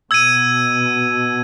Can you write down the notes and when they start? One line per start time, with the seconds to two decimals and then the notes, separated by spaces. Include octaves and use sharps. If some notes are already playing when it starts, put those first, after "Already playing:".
0.11 B2 E6 G#6 D#7